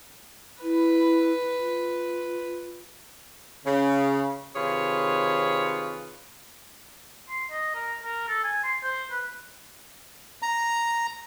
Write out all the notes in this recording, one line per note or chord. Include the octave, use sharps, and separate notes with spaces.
E4 B4
F4
C#3
C3 D#3 F4 G#4 B4 C#5
C6
D#5
A#4
A#4
A4
G#5
C6
C5
B4
A#5